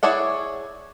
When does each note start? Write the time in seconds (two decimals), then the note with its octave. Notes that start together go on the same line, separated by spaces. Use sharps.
0.03 E4 G#4 C#5 D5 F#5